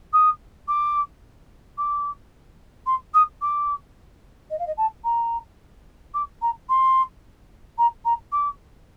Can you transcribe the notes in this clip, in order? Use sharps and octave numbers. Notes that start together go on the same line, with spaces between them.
D#6
D6
D6
C6
D#6
D6
D#5
F5
D#5
A5
A#5
D6
A#5
C6
A#5
A#5
D6